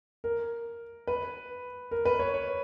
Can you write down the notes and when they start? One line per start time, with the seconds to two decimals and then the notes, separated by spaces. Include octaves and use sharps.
0.24 A#4
1.07 B4
1.91 A#4
2.05 B4
2.19 C#5
2.34 C#5